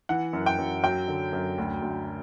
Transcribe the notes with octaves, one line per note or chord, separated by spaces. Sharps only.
E3 F#5
F#2
G5
F#2
F#3 G5
D3
F#2
D2
D2